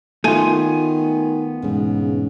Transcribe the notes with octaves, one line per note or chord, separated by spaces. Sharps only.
D#3 A3 B3 F4 G#5 D#7
E1 G#2 C#3